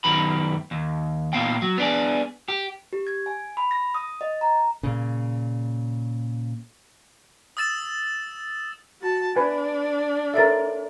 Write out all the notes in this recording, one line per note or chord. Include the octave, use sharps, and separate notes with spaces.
F#2 D#3 B3 G4 B5
D#2
A#2 A#3 B3 F5 G5
F#3
B3 D4 G#4
G4
G4
G#6
G#5
B5
A#6
D#6
D#5
A#5
A#2 C#3
D#6 E6 A6 E7
F#4 A5
D4 B4 G#5
A4 A#4 C#5 E5 A6